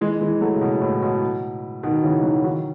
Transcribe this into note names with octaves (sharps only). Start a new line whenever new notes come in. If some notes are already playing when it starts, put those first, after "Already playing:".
E3 G#3
E3 G#3
F#3 A3
C#3
B2
A2
B2
B2 D#3
C#3 E3
D#3 F#3
D#3 F#3